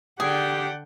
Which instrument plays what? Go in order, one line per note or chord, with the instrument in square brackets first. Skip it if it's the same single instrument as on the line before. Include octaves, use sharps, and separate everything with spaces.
[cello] D3 G5 [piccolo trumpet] G4 [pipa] G#4 [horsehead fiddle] D5 F#5